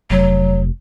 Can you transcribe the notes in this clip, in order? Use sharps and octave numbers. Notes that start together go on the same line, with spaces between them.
F1 F#3